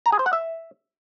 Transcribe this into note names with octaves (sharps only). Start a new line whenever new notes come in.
A#5
G#4
C5
F#5
E5